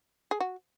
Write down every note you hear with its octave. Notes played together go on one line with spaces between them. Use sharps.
G#4
F#4